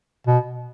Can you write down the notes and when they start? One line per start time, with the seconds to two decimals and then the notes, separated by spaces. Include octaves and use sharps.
0.27 B2